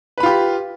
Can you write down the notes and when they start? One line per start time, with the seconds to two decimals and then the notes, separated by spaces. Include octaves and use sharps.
0.18 B4
0.20 B5
0.23 F4
0.26 G4